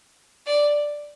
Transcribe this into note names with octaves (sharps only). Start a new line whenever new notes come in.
D5